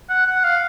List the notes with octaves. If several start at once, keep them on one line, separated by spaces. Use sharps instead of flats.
F#5
F#5
F5